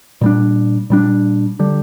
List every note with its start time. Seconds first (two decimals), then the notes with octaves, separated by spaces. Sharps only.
0.21 A#2 G3 D4
0.90 A#2 G3 D4
1.59 D3 G3